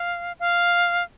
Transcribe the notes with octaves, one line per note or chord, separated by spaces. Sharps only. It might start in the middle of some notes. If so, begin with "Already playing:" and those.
Already playing: F5
F5